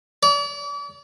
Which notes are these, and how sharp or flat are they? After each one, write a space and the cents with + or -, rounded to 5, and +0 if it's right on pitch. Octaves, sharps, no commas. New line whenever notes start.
D5 -40